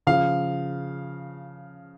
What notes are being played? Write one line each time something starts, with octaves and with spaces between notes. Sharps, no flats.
C#3 F3 F5